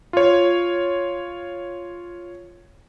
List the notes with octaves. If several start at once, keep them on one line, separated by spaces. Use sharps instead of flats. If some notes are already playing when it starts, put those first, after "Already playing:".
F4 C#5